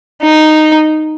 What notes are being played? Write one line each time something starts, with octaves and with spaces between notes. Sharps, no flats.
D#4